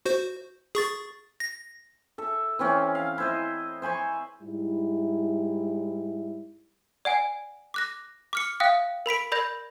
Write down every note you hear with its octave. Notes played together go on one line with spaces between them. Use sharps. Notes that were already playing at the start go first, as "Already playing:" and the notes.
F#4 C5
G#4 C#6 A6
A#6
A4 E5
E3 C4 C#4 D5
F5
E4 C5 D#5
C5 G#5 B5 C#6
G#2 G3 E4
D5 F#5 G#5
D6 F#6 A#6
D6 F6 C#7
E5 F5 G5 D#6 F#6
A#4 B5 B6 D7
A#4 D5 B5 G6 A#6